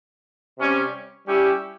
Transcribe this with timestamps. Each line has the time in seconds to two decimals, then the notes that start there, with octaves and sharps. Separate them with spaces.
0.58 C3 G3 C#4
1.26 G3 C#4 E4 G4